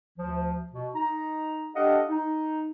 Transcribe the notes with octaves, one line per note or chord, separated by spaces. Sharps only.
D2 F3
B2
D#4 A#5
D4 G4 A4 D#5 F5 F#5
D#4